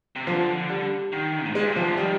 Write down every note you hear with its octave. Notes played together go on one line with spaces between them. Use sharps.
C3
D3 F3
G3
D#3
G#2
G#3
A#2
C3 F3
D3
D#3 G3